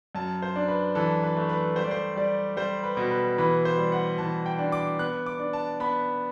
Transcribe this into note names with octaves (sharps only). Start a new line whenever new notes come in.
F#2 A5
C5
D4
B4
E3 A4
B4
A3
B4
G3 C5
D5
C5
G3 D5
G3 C5
B4
B2
B4
E3 B4
C5
G3
F#5
E3 A5
G5
D4
D6
B3 F#6
D6
D4
A5
B3 B5